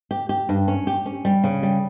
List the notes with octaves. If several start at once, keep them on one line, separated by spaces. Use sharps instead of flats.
G4
G4
G2
C#4
G4
C#4
G3
C#3
G3